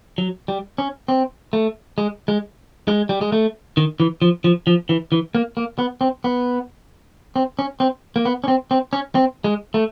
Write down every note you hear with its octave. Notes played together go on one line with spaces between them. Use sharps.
F#3
G3
C#4
C4
A3
G#3
G#3
G#3
G3
G#3
A3
D#3
E3
F3
F3
F3
E3
E3
A#3
A#3
B3
C4
B3
C4
C#4
C4
A#3
B3
C#4
C4
C4
C#4
C4
G#3
A3